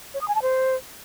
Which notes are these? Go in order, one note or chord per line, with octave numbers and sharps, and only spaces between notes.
C#5
D#6
G#5
A5
C5